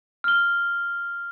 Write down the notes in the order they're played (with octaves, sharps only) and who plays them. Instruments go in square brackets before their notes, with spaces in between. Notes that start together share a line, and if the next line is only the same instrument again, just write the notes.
[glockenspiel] F6 G7